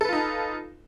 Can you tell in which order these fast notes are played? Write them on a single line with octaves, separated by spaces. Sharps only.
A4 B4 F4 D#4